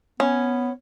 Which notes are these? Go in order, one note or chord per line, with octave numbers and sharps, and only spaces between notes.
B3 C#4